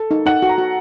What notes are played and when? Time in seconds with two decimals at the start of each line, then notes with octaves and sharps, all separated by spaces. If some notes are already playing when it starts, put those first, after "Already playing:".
Already playing: A4
0.11 D#4
0.26 D#4 F#5
0.42 F#4
0.49 A#5
0.58 F#4